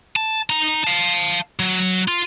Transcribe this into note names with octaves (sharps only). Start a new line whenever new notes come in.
A5
D#4 A#5
F5 A5
F#3
F4